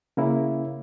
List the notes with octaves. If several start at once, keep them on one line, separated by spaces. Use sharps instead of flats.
C#3 A#3 E4